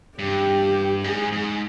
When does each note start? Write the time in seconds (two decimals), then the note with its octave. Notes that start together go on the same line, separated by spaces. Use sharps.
0.18 G2 G4
1.03 G#2 G#4
1.32 G#2